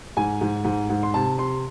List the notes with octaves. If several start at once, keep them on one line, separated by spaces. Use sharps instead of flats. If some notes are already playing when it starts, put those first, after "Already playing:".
G#2 G#5
G#2
G#2
G#2
C6
C3 A5
C3 C6